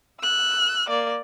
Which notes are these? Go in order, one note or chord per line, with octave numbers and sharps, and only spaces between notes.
E6 F#6
A#3 D5